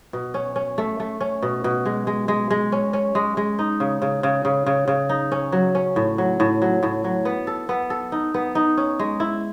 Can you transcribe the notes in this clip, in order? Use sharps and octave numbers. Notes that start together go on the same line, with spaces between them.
B2
C#4
C#4
A3
A3
C#4
B2
B2
G#3
G#3
G#3
G#3
C#4
C#4
G#3
G#3
D#4
C#3
C#3
C#3
C#3
C#3
C#3
D#4
C#4
F#3
C#4
A2
F#3
A2
F#3
A2
F#3
B3
A4
B3
A4
D#4
B3
D#4
C#4
G#3
E4